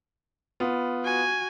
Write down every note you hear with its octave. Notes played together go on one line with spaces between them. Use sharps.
B3 F4
F#4 G#5